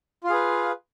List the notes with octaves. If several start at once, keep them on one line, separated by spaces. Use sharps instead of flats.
F4 G#4 B4 F5